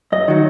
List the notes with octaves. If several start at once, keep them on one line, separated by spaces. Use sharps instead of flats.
F#2 D#5
D#3 F#3